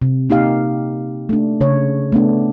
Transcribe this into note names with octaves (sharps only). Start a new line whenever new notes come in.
C3
A#3 D#4 G4 F5
A3 D4
C#3 C#5
A3 B3 D4